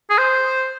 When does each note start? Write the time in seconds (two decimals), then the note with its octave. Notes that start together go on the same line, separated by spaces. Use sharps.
0.10 G#4
0.18 C5